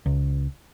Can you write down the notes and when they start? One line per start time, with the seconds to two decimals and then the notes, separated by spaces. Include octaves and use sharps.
0.06 C#2